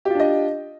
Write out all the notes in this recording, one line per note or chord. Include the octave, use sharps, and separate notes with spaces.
D4 F4 G4 D#5